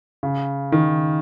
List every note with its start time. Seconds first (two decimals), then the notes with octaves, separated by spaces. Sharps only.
0.23 C#3
0.72 D#3